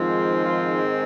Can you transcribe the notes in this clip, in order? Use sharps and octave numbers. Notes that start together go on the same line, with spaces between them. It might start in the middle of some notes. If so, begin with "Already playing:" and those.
Already playing: G#2 D#3 F3 G#3 C4 F4
F3 F4